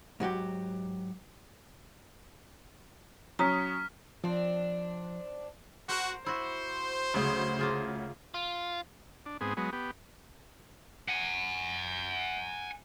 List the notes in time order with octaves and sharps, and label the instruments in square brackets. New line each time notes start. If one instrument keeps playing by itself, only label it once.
[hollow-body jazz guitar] G#2 F#3 F#4 G4
[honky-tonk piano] F#3 C#4 D#6 [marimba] A#5 [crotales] C#6 F6 B6
[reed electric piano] F3 [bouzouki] C4 D4
[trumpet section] F#4 [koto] A#4 C5
[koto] E4 F#4 [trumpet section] C5
[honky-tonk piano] D2 C#3 [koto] F#3 B3 G#4
[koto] A#3 F4 G#4
[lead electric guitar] F4
[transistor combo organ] D4
G#2 B3 C4 G#4
F#3 G#3 B3
B3 G4
[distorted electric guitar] F#5 G#5